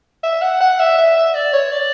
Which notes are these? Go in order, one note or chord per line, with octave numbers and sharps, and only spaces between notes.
E5
F#5
F#5
E5
E5
E5
D5
C#5
D5